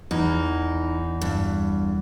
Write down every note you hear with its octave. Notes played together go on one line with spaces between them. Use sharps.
E2 D#4
G2